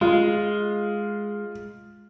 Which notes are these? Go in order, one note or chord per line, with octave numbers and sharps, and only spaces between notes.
G#3 F4